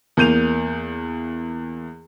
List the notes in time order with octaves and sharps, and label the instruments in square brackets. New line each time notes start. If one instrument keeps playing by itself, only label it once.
[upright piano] E2 A#3 G6 D#7 F7